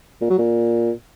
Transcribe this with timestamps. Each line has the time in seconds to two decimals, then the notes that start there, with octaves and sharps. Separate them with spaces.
0.21 A#2
0.30 F#3
0.38 A#2